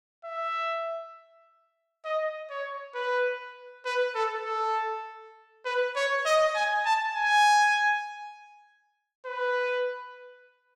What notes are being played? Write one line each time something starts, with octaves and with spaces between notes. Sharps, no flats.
E5
D#5
C#5
B4
B4
A4
A4
B4
C#5
D#5
G#5
A5
G#5
B4